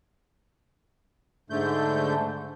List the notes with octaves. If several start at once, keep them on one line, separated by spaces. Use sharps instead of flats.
G#2 D3 A3 G6